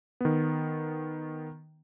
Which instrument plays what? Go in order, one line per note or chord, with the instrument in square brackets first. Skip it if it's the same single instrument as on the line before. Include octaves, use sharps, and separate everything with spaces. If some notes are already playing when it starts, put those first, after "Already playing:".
[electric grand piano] D#3 B3